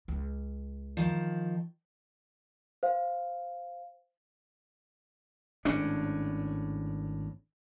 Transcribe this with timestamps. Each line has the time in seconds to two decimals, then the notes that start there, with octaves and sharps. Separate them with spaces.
0.08 C#2
0.97 D#3 F3
2.83 C5 F5
5.65 G#1 A2 C#4 D4